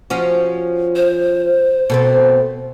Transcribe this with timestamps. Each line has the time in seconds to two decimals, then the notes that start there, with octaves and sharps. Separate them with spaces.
0.10 F3 C#4 F#4
0.95 C5
1.90 B2 A3 C4